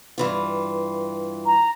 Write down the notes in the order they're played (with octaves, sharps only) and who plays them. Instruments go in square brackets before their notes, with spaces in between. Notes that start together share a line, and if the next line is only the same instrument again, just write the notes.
[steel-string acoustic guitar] G2 E3 F4
[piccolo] A#5